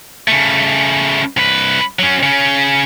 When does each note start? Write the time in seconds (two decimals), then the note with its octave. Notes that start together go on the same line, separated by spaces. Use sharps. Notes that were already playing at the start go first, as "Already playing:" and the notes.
0.28 C#3 A3
1.37 C2 B4
1.99 F#3 C#4
2.23 C#3 C#4